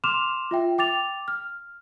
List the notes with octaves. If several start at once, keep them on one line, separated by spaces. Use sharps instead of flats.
C6 D6 F6 E7 F7
F4 E5 G5
G5 D6 A6 F7
F6